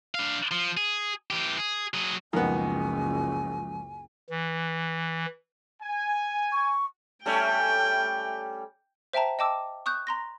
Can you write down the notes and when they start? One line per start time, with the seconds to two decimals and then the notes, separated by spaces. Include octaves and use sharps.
0.15 D4 F5
0.51 F3
0.77 G#4
1.30 E3 G4
1.58 G#4
1.94 F#3 G#4
2.33 F#1 C#2 D#3 F3 G#3 B3 F4 G#5
4.30 E3
5.81 G#5
6.52 C#6
7.26 G3 A3 C#4 G5
9.13 C5 E5 G5 A5 A#5
9.39 D#5 G5 A5 D6 E6
9.86 C#6 D#6 F#6 G6
10.07 A#5 C6 A#6